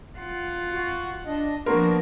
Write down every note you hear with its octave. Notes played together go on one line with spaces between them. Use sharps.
F4 F#5
F#4
D4 D#5
F3 A#3 B3 D4 F#4 A#4 C6